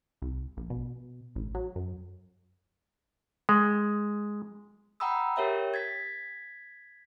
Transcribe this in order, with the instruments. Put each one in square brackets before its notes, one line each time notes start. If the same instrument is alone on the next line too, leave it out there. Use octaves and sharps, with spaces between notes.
[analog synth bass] C2
A#1
B2
A1
F#3
F#2
[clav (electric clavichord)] G#3
[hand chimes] F#5 G5 A#5 B5 D#6 E6
G4 A#4 C#5 E5 G5
G#6 A6 B6